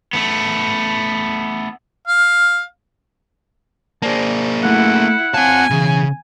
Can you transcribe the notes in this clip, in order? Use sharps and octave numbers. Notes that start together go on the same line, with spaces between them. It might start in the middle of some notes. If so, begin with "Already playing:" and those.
A3 B3
F5
A#3 G#4 C5 D5 A5
A3 E4 A4 F5 F#5
C4 C#5 F5 G#5 A5
B1 C#3 E3 G#4